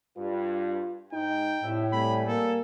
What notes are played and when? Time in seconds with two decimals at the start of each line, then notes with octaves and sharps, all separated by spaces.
0.17 G2 F4
1.13 G#2 G#3 D#4 G5
1.62 C2 A2 E5
1.92 G3 A3 C4 G#5 B5
2.28 A#3 A4